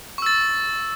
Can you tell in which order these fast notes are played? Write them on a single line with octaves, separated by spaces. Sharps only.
C#6 E6 A6